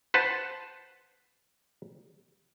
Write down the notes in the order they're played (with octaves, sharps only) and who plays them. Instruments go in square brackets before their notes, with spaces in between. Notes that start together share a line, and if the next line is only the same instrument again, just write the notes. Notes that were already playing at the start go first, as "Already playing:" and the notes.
[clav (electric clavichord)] B4 C5 F#5 A5